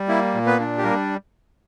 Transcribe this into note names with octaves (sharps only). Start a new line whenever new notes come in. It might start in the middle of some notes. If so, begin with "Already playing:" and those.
Already playing: G3
A#3 E4
A#2
B3 B4
D4
G4
G3 A#3 A#4